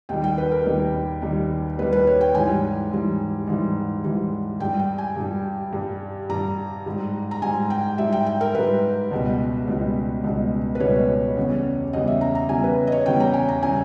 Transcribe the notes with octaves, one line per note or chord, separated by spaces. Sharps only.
D#2 D#3 G3 G5
G5
B4
A#4
D#2 D#3 G3
D#2 D#3 G3
D#2 D#3 G3 B4
B4
C#5
G5
G#2 E3 G3 G#5
G#2 E3 G3
G#2 E3 G3
G#2 E3 G3
G2 G3 G5
G5
G#5
G2 G3
G2 G3
G2 G3 A#5
G#2 G3
A#5
G#2 G3 G#5
G5
G#2 G3 E5
G5
G5
A#4
G#2 G3 B4
C#2 B2 G3
C#2 B2 G3
C#2 B2 G3
B4
C#2 B2 G3 C#5
E2 C#3 G3
E2 C#3 G3 D#5
E5
A#5
A#5
E2 C#3 G3 G#5
B4
D#5
C#5
E2 C#3 G3 G5
A#5
G#5
A#5
C#3 G3 G#5